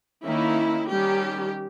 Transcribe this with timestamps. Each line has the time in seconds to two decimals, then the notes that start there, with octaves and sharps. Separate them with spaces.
0.24 D#3 A#3 C#4 E4
0.90 D#3 G3 C#4 G4